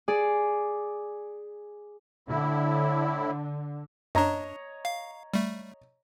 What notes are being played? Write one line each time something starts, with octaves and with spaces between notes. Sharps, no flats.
G#4 D5
A2 D3 E4
F#2 D4 C#5 D#5 A#5
F5
G3 A3